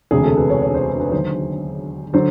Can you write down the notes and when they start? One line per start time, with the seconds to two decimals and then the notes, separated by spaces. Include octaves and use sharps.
0.11 E1 D2 C3 G#4
0.24 A4
0.37 B4
0.50 C#5
0.62 C#5
0.75 C5
0.88 B4
1.00 B4
1.12 D#2 D3 F#3 C5
2.13 D3 F#3 C5